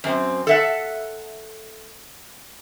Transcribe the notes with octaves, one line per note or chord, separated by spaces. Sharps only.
F#2 C4
A4 E5 F#5